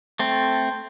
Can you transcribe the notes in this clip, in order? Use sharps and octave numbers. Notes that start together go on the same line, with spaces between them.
A3 C4